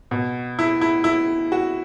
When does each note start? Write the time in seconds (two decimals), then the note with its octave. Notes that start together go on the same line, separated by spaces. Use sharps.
0.11 B2
0.59 E4
0.81 E4
1.04 E4
1.52 F#4